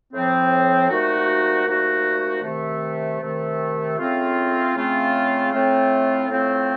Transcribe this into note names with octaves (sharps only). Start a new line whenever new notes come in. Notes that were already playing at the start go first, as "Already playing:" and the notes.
A2 F3 C4
C2 A#2 A3 D#4 F#4
C2 A#2 A3 D#4 F#4
C3 D#3 A3
C3 D#3 A3
C#3 A3 C4 F4
C#3 A3 C4 F4
A2 A3 C4 F4
A2 A3 C4 F4